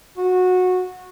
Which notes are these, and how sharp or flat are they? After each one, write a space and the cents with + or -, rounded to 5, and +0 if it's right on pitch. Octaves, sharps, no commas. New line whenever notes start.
F#4 -15